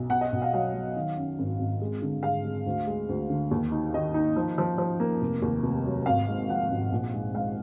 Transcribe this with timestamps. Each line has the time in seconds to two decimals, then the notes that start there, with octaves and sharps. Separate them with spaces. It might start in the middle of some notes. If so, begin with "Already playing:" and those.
Already playing: B1
0.10 B2 F#5
0.21 D#5
0.32 B1
0.42 F5
0.53 F#3 F5
0.74 F#3
0.96 D#3
1.17 F#2
1.39 G#1
1.59 G#1
1.81 G#3
2.02 D3
2.23 G#3 F5
2.44 G#3
2.66 D2
2.87 G#3
3.09 D2
3.30 D3
3.51 D#2
3.72 D#4
3.94 D#3 D#5
4.14 D#4
4.36 F3
4.58 F3
4.78 F3
5.00 A#3
5.21 F1
5.42 D#2
5.63 F1
5.86 F#3
6.06 G#1 F5
6.28 G#2
6.49 F3 F#5
6.71 G#1
6.92 A#1
7.13 G#2
7.34 G#2 F5